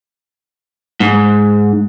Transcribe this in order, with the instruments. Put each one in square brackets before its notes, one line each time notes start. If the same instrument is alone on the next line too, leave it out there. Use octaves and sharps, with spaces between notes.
[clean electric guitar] G#2